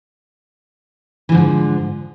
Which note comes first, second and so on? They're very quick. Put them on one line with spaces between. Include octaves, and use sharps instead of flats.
E3 D3 G#2 F3